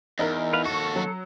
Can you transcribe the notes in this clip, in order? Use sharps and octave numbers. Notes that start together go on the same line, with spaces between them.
E2 D#4 E4 A#4
B4 F5
D#2 F#4 A4 C#6
F#3